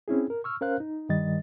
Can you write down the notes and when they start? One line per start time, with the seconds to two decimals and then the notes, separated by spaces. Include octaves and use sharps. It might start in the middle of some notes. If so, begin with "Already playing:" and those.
0.08 C4 C#4 E4 G#4
0.30 A#4
0.44 C#6 E6 F6
0.61 C#4 A#4 C5 F5 F#6
0.80 D#4
1.09 G2 D#3 G3 D#5 A6